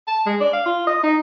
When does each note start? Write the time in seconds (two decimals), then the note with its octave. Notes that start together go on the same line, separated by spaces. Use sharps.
0.07 A5
0.26 G#3
0.40 D5
0.53 F5
0.66 F4
0.87 D#5
1.03 D#4